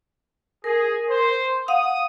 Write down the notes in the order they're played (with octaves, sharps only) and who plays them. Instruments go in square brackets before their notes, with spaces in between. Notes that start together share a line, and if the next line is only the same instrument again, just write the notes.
[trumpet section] G#4 [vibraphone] A#4
[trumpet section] C5
[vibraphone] F5 F#5 [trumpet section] D#6